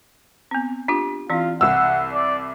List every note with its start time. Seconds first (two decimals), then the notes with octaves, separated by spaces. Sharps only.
0.51 B3 C4
0.88 D4 F4 G4
1.30 E3 C4 E4 F4
1.61 C2 F#5 E6
2.13 D5